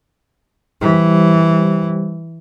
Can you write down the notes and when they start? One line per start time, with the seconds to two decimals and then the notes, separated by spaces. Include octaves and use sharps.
0.81 E3 G3 G4 C5